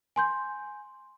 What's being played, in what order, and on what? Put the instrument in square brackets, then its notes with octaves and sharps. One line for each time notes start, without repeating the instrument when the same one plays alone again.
[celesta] G#5 C6 G6